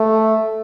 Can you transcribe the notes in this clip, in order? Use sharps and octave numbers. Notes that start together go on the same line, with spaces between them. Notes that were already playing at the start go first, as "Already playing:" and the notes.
Already playing: A3